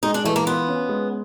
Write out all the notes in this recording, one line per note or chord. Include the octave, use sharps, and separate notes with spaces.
G#3 D#4
D4
E3 A3
A#3
B3 F4
C#4
G#3